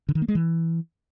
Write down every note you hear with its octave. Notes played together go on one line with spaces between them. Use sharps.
D3
D#3
A#3
G#3
E3